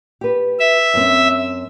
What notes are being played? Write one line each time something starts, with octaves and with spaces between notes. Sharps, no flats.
G4 B4
E5
F#2 C4